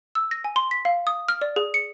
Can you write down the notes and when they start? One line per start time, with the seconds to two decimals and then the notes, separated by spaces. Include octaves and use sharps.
0.15 E6
0.31 A#6
0.44 G#5
0.56 C6
0.71 B6
0.85 F5
1.07 D#6
1.28 F6
1.42 D5
1.56 G#4
1.74 C#7